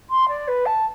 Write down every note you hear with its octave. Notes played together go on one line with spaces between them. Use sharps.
C6
D5
B4
A5